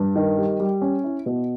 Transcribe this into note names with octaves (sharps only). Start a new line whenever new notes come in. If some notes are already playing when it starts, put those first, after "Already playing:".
Already playing: G2
D#3
G3
G3
C#4
E4
B2